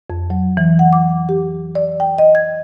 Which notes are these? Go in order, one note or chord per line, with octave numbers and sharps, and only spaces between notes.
F2
F#3
E3
F#5
D6
G4
D5
G5
D#5
G#6